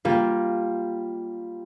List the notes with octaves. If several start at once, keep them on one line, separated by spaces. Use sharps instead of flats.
G3 A#3 F4